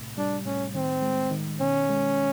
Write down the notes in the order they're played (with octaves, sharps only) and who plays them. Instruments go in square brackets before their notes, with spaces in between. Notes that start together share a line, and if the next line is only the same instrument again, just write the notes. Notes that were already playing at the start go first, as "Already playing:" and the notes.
Already playing: [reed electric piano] A2 C3
[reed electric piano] G3 [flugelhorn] D4
[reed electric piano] A2 [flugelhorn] C#4
[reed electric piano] D#3 [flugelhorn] C4
[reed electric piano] G#3
D#3
[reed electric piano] B2 [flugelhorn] C#4
[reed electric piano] G#3